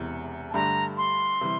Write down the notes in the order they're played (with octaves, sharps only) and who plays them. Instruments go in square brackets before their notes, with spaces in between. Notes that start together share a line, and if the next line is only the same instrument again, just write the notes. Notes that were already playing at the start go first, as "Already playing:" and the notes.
Already playing: [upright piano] E1 E2 C3
[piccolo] A5
[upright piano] G2 D3 A3 D4 G4 [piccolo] A#5
[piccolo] C6
[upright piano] C3 E3 G3